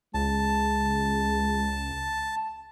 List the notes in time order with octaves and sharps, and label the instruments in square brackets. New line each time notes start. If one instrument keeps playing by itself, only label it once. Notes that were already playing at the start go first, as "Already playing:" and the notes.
[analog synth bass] C#2 [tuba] G#3 [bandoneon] A5